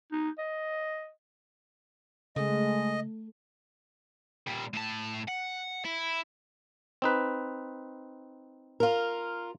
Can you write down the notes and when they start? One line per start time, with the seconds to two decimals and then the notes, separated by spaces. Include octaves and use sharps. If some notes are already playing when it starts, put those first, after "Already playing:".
0.12 D#4
0.39 D#5
2.36 C#3 G#3 A3 D#5
4.47 A#2 G3
4.73 A2 A5
5.28 F#5
5.85 E4
7.02 C4 D#4 B4
8.80 F4 A#4